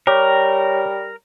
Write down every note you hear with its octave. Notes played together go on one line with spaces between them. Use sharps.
G3 G4 A#4 C#5